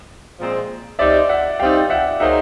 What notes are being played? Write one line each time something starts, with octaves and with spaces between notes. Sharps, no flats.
A#2 F3 G#3 C4
G3 C4 D#4 D5 E5
E5 F#5
G3 C4 D#4 F5 G5
E5 F#5
F#3 A#3 D#4 G#4 C5 E5 F#5